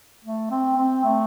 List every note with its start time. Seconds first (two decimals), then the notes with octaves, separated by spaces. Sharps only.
0.24 A3
0.51 C4
0.77 C4
1.04 A3